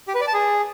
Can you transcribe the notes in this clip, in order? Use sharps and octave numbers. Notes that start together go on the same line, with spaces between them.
G4
B4
D5
A5
G#4